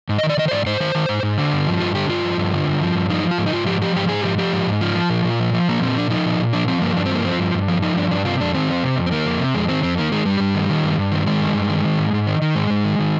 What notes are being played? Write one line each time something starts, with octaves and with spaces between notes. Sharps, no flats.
G#2
D#3 D#5
D5
D#3 D#5
C5
G#2 D5
G#2 C5
D#3 C5
D#3
G#2
G#2
D3
G2
F3
G2 F4
D3 G4
G2 F4
F3
G2
D3
G2
F3
G2
F3 D#4
F3
F4
G#2
D#4
G#2 F4
F3 G4
F3 G4
G#2 G4
G#2 G#4
F3 G4
F3 G4
G#2
G#2
F3 F4
F3
A#2
A#2
F3
F3
A#2 A#3
A#2 C4
F3 D4
F3 D#4
A#2
A#2
F3 D4
F3 C4
G2 A#3
G2 D4
C4
F3 A#3
F3 C4
G2
G2
F3
F3 D#4
G2 D4
G2 D4
C3 F4
F2 D4
D#3 C4
F2
C3
F2
C4
D#3 A#3
F2
C3
F2 G#3
D#3 C4
F2 C4
D#3 A#3
D#3 G#3
G2 G3
G2
D#3
D#3
G2
G2
D#3
D#3 G#3
G2
G2
D#3
D#3
G#2
G#2
D#3
D#3
G#2 G#3
G#2
D#3
D#3